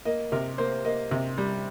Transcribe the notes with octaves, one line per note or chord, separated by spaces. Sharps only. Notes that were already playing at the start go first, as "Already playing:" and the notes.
A#3 D#5
C3 A#4
A#3 C5
A#3 D#5
C3
G3